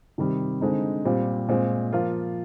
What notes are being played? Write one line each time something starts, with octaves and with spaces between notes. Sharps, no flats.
C3 D#3 G3
D3 G#3 C4 D#4
A#2 G3 C4
A#2 G#3 C4
F3 A#3 F4